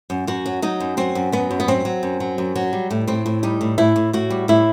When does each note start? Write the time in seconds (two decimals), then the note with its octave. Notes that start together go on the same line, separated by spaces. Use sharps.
0.10 F#2
0.27 F#2 F#4
0.46 F#3
0.62 F#3 D#4
0.80 F#2
0.97 F#3 C4
1.15 F#2
1.32 F#3 B3
1.51 F#2
1.60 B3
1.68 F#3 C4
1.85 F#3
2.03 F#2
2.20 F#3
2.38 F#2
2.56 F#3
2.73 G3
2.91 A2
3.07 A2 C4
3.26 A2
3.43 G3 D#4
3.61 A2
3.78 A2 E4
3.96 A2
4.13 A2 F#4
4.30 G3
4.48 A2 E4